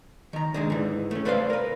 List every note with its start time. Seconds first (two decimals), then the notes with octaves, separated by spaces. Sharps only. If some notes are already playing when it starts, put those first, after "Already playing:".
0.33 D#3 A#5
0.54 D3 D#3 G#3
0.70 G#2 E3
1.11 A3 C#4
1.25 A3 B4 C5 D5 E5 F5
1.50 A#4 B4